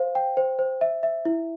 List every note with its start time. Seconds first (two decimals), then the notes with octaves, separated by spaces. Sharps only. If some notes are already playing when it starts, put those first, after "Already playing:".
Already playing: C5 F5
0.15 G5
0.37 C5
0.59 C5
0.81 E5
1.03 E5
1.25 E4